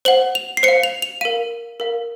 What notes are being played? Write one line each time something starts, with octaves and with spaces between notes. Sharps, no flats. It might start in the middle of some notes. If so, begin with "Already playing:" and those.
C5 F#5 F#7
F7
C7
C5 C#7
F5
F7
F7
A#4 F5 D#7
A#4 F5